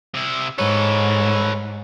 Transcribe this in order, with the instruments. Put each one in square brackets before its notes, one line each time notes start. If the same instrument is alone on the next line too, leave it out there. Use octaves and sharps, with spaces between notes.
[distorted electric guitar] C3 E4
[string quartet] G#2 [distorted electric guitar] A4 B4 [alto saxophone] C#5